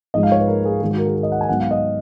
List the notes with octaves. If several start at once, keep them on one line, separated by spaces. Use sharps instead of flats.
G#2 F3 G#3 D#5
F5
C#5
B4
A#4
G#4
G#2 D#3 G#3 G#4
F#4
A#4
G#4
A#4
D#5
F#5
G#5
G#2 F#3 B3 F#5
F5
D#5